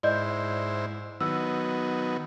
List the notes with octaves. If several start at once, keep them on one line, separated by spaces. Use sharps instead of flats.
G#2 E4 C5 D5 D#5 G6
D#3 F#3 B3 E6